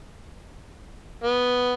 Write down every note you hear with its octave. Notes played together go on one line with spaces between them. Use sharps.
B3